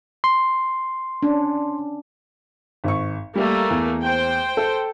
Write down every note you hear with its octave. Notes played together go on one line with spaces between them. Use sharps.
C6
C#4 D4
G#1 C#6
G3 A3 A#3
E2
C5 G5
A4